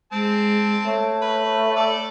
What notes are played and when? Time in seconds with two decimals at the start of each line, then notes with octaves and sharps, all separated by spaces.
0.12 G#3 C4 A5
0.86 A3 C#5
1.22 B4
1.76 A4 D5